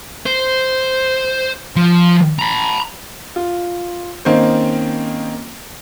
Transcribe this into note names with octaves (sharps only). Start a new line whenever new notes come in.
C5
F3
A#5 B5
F4
D#3 A#3 C4 C#4 C5